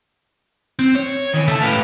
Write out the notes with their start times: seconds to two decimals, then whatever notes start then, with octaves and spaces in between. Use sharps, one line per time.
0.79 C4
0.95 C#5
1.34 D#3 E3
1.48 C#3 A3 A5
1.62 A2 G4 B4 F5